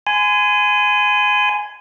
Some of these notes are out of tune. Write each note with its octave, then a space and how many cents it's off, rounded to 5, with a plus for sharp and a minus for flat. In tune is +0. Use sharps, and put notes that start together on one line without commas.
G#5 +5 C6 -40